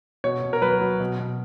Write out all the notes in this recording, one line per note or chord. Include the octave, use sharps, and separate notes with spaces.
B2 C#5
B2
A#4
F#3 B4
F#3
B2
B2